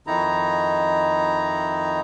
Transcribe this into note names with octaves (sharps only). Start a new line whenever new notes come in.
F2 D#3 D#4 E4 A#5